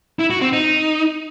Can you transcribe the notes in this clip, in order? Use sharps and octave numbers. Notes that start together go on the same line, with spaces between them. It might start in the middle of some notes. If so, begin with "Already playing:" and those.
E4
F#4
C4
D#4